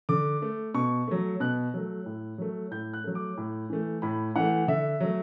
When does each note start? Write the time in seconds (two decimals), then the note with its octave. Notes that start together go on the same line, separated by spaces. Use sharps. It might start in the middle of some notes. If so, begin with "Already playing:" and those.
0.09 D3 D6
0.42 A3
0.74 B2 C#6
1.08 F#3 A3
1.40 B2 F#6
1.74 F#3 A3
2.06 A2
2.38 F#3 A3
2.71 A2 G6
2.94 F#6
3.04 F#3 A3
3.15 D6
3.37 A2
3.70 E3 A3
4.02 A2 B5
4.36 E3 A3 F#5
4.68 D3 E5
5.00 F#3 A3